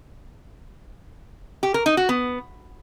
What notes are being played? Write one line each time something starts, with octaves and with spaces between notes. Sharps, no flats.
G4
A#4
D#4
F#4
B3